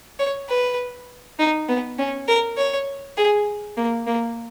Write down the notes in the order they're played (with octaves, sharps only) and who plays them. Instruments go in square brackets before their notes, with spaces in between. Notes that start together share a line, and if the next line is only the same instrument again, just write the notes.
[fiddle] C#5
B4
D#4
B3
C#4
A#4
C#5
G#4
A#3
A#3